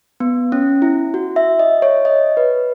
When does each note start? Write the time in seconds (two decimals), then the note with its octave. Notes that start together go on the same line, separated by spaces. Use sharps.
0.20 B3
0.52 C#4
0.82 E4
1.14 F#4
1.36 E5
1.59 D#5
1.82 C#5
2.05 D#5
2.37 B4